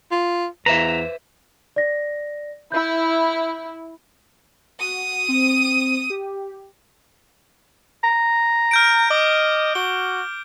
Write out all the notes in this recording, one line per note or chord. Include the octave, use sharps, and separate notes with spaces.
F4
E2 B4 C5 E5 A#5
D5 A#6
E4 G6
F#4 D#6
C4
G4
A#5
F6 G6 D7
D#5 D6
F#4 G7